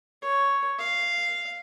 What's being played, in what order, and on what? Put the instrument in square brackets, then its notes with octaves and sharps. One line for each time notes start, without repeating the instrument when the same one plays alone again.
[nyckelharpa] C#5
F5